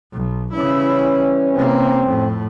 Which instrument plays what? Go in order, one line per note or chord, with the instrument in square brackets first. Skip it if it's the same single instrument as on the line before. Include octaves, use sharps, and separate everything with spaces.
[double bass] B1
[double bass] C#3 E4 [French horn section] E3 G3 C#4
[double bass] C3 A#3 [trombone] C4
[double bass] F2 A2